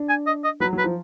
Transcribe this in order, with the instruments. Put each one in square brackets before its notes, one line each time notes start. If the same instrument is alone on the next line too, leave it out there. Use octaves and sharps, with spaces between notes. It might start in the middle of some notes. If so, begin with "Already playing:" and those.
Already playing: [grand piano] D4
[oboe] G#5
D#5
D#5
[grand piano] F#3 [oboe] B4
[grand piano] F#3
[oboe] B4
[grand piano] F3